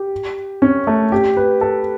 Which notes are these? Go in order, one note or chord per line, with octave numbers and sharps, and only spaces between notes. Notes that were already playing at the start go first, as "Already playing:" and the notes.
Already playing: G4
C#4
A3
G4
B4
A4